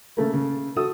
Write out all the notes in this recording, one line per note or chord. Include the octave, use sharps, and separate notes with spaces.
C#3 A3 A#3
C#3
F#4 A4 D#6 E6